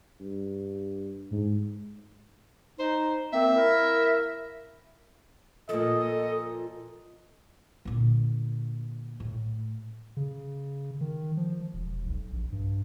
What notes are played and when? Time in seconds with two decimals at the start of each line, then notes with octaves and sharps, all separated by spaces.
0.20 G2
1.31 G#2
2.79 D#4 C5
3.33 A#3 C4 E5
3.56 A#3 E4 A#4
5.69 A#2 F3 A4 D#5
7.85 A#2 D3
9.20 A2
10.17 C#3
11.01 D#3
11.37 F3
11.74 E1
12.06 B1
12.33 A#1
12.52 G2